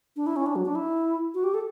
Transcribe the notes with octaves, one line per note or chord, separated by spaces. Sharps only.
D4
E4
C#4
D4
F#3
D4
E4
F#4
G4
A4